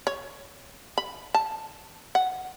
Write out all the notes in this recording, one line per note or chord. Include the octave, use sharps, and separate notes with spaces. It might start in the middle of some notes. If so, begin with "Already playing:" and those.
C#5
B5
A5
F#5